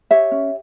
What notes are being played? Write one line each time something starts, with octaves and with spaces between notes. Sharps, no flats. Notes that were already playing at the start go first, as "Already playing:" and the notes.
G4 C#5 E5
C#4